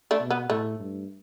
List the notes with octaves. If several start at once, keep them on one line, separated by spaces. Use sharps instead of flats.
A3 D4
B2
B3
A2 A3
G2